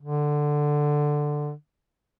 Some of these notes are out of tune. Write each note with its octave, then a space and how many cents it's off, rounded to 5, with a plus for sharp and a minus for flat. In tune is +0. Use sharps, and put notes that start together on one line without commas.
D3 +10